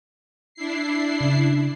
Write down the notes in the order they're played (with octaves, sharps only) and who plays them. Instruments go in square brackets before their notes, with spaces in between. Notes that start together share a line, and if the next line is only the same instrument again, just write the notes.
[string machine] D4 E4 C7
[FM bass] C#3